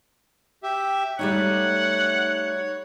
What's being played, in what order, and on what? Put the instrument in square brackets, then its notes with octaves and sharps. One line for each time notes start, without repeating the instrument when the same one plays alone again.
[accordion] G4 E5
[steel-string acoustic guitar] G3 A3 D#4 [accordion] C#5 [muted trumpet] F#5